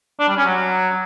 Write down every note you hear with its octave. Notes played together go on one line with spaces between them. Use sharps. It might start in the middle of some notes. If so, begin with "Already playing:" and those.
D4
G3
C#4
F#3